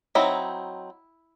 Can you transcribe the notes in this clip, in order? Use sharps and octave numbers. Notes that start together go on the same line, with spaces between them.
F#3 C4 D#4 E4